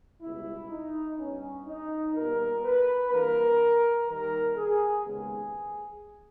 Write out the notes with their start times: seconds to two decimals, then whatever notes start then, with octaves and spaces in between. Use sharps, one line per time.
0.21 C#2 B2 G3 E4
0.70 D#4
1.18 G2 G3 B3 C#4
1.66 D#4
2.14 A#2 G3 B3 A#4
2.63 B4
3.11 G2 E3 A#3 A#4
4.08 D#2 D#3 G3 A#4
4.56 G#4
5.05 D#2 C#3 G#3 B3 G#4